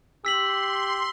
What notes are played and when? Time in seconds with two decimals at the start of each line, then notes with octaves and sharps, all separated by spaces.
0.25 G4 C6 E6 B6 F#7